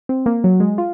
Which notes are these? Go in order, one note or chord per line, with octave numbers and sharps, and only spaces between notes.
C4
A#3
F#3
G#3
F4